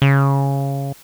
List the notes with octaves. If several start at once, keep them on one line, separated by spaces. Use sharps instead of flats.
C#3